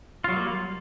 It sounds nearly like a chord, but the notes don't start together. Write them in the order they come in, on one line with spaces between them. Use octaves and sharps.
F4 F#3 G3 A#3